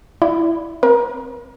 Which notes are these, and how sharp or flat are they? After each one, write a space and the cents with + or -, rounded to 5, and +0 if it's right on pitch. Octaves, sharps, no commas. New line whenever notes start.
E4 +5 D5 +0
C4 +5 A#4 +35